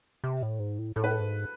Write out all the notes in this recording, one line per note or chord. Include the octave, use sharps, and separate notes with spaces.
C3
A2
G#2
A2
A2 A4
B4
A4
G#2